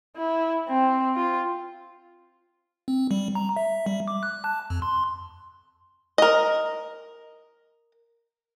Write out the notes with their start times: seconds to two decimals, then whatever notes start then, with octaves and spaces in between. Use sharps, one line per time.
0.16 E4
0.69 C4
1.16 F4
2.88 C4
3.11 G3
3.35 A#5
3.57 E5
3.86 G3
4.08 D6
4.23 F#6
4.44 A5
4.70 F2
4.82 C6
6.18 A#4 D#5